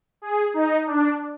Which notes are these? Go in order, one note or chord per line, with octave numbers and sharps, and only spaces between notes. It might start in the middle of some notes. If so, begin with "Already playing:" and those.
G#4
D#4
D4